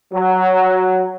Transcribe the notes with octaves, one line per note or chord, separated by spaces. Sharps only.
F#3